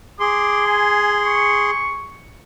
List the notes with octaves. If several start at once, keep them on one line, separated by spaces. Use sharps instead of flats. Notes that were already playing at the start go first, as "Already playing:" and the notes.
G#4 C6 D6
G#5
C#6